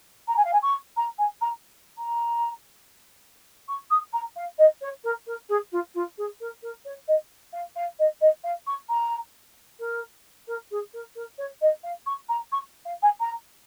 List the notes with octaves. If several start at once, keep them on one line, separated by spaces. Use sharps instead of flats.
A#5
G#5
F5
G#5
C#6
A#5
G#5
A#5
A#5
C#6
D#6
A#5
F5
D#5
C#5
A#4
A#4
G#4
F4
F4
G#4
A#4
A#4
C#5
D#5
F5
F5
D#5
D#5
F5
C#6
A#5
A#4
A#4
G#4
A#4
A#4
C#5
D#5
F5
C#6
A#5
C#6
F5
G#5
A#5